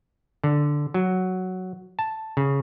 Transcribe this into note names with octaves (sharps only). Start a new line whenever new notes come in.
D3
F#3
A5
C#3